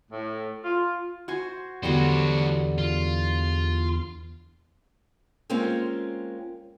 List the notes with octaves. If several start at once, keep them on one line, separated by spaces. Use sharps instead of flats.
A2
F4
F#4 C5 G#5
E2 D3 F#3 G3 F#4 C5
F4
G#3 A#3 C4 C#4 F4